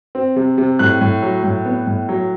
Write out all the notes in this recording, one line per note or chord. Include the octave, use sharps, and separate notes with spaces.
C4
C3
C3
A2 F#6
A2
F#3
A2
B3
A2
F#3